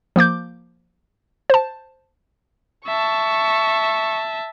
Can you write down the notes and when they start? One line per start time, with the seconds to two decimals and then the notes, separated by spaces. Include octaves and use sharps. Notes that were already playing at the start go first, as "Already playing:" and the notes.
0.16 F3 A#3 D6 G6
1.50 C5 A5
2.87 E5 A5 C#6